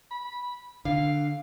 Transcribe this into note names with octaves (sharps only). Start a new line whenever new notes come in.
B5
D3 F5